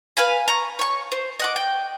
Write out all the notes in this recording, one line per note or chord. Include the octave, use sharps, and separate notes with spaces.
B4 F5 G#5 B5
A#5 C#6
C#5 C#6
C5
D#5 F#5 D6
G5